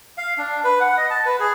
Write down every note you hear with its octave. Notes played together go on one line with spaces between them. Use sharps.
F5
D4
B4
F#5
D#5
A5
B4
G#4